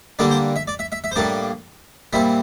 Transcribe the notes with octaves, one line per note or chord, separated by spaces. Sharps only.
D3 G3 A#3 D4 D5
C5
E5
D5
E5
E5
E5
C5
A2 G3 A#3 D4 D5
A#2 G3 C4 E4 E5